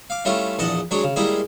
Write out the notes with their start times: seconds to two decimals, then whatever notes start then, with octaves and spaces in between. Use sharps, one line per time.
0.10 F5 D6
0.25 G3 A3 C#4 E4 F4
0.59 A#1 E2 D5 D#5 F#5 A5
0.91 F#3 G#3 D4 G#4 C#5
1.04 C#3
1.16 G3 G#3 A#3 E4 G#4